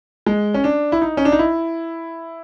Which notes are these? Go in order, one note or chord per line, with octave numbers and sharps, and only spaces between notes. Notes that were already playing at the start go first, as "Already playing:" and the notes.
G#3
C#4
D4
E4
D#4
C#4
D4
D#4
E4